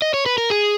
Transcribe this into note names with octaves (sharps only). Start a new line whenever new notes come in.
D#5
C#5
B4
A#4
G#4